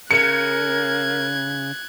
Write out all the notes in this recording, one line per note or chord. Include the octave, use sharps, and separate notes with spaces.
C#3 A#4 F#6 G#6 C#7